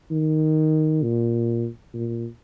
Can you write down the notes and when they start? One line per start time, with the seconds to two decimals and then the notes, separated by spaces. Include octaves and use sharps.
0.11 D#3
1.03 A#2
1.94 A#2